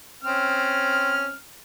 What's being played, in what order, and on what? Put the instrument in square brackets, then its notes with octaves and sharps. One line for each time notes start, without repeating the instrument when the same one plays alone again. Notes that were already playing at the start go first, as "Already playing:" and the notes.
[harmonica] C4 C#4 F6